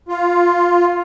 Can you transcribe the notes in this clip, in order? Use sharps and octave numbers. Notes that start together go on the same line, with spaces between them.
F4